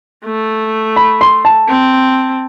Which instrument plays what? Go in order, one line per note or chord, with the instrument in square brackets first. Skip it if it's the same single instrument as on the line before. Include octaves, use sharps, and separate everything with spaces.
[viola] A3
[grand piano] B5
C6
A5
[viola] C4